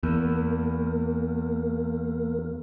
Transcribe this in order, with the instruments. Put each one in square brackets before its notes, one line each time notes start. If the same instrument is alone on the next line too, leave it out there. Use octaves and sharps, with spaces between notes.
[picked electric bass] E2 [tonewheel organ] A#3 A#4